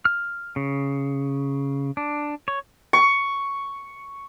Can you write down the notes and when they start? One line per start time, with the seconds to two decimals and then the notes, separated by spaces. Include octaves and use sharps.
0.05 F6
0.56 C#3
1.97 D4
2.48 C#5
2.93 C#6